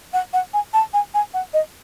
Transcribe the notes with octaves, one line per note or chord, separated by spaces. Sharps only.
F#5
F#5
G#5
A5
G#5
G#5
F#5
D#5